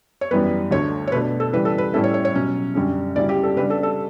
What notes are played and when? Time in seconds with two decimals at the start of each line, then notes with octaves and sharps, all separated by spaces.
0.21 C#5
0.31 F#2 E3 G3 B3 B4
0.71 D2 D3 A3 C#5
1.07 C#5
1.12 B2 A3 D4 B4
1.40 A4
1.53 C#3 E3 G3 B4
1.65 A4
1.78 B4
1.93 A2 G3 C#4 E4 A4
2.04 C#5
2.14 C#5
2.25 C#5
2.34 B2 F#3 C#4
2.75 F#2 D3 G3 C#4
3.16 D2 C#3 G3 C#4 E4 D5
3.29 G4
3.43 A4
3.56 C#3 G3 D4 B4
3.70 A4
3.83 A4